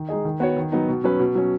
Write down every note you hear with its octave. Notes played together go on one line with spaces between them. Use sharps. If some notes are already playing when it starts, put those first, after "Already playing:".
Already playing: D#3
G#3 D#4 G#4 D#5
D#3
B3 F#4 C#5
D#3
F#3 B3 D#4
B2
F#3 C#4 B4
B2
F#3 C#4